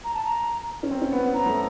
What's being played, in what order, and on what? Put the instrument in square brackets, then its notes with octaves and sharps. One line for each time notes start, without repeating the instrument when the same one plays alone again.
[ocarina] A#5
A5
A#5
[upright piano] C#4
C4
C#4
B3
B3
[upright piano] B3 [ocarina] A#5
[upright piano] A3